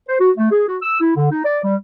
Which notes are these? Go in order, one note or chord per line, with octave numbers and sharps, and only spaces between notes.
C5
F#4
A3
G#4
F#4
E6
E4
D3
D#4
D5
G3